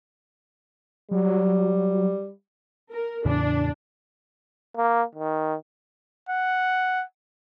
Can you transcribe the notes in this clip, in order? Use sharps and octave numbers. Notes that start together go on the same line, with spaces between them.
F#3 G3
A#4
E2 A2 C#3 D4
A#3
D#3
F#5